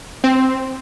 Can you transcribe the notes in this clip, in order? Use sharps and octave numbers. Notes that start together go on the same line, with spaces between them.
C4